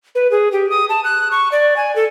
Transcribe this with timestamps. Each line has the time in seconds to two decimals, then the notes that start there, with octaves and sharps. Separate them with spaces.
0.15 B4
0.31 G#4
0.52 G4
0.70 D#6
0.89 A5
1.04 F#6
1.31 C#6
1.52 D5
1.76 G#5
1.96 A4